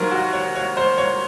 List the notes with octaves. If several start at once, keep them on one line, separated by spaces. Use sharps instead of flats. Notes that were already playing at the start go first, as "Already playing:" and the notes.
Already playing: D#2 D#3 F#3 A#4 C5
F#4
C#5
C#5
C5
C#5